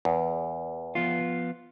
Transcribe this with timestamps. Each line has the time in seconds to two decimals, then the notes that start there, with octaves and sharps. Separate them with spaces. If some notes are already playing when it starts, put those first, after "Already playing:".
0.05 E2
0.95 F3 B3 F4